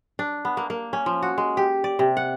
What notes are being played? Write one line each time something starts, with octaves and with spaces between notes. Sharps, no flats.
D4
B3
A#3
A#3
C#4
F3
F#4
G#3
G4
D5
C3
F#5